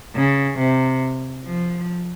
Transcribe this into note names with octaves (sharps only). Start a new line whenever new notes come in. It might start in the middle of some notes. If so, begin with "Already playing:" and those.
C#3
C3
F3